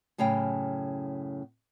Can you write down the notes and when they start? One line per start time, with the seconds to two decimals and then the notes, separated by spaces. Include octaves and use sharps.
0.18 F#2 A2 C#3 F5 G5